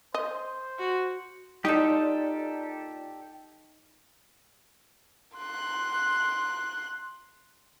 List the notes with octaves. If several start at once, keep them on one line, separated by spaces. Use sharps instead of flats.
C5 D#5
F#4
A#2 D4 D#4 F4 G4 A4
C6 F#6